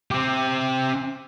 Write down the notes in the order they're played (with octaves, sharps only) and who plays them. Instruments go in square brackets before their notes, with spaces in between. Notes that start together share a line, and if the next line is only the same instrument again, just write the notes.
[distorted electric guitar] C4 G4